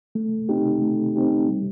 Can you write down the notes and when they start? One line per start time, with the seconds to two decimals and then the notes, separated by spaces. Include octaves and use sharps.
0.15 A3
0.49 C4 D#4 G4
0.82 A3
1.16 C4 D#4 G4
1.48 G3